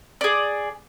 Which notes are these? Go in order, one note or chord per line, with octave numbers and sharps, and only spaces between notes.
G#4 D5